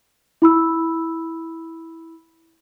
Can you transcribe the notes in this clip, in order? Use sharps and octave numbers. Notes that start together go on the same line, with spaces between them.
E4 B5 E6